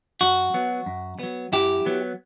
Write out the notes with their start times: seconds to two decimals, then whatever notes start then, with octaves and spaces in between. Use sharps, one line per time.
0.21 F#2 F#4
0.54 F#3 B3
0.86 F#2
1.19 F#3 B3
1.52 F#2 E4 G4
1.86 F#3 B3